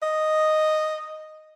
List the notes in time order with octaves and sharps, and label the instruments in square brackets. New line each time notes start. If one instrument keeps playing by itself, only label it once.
[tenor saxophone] D#5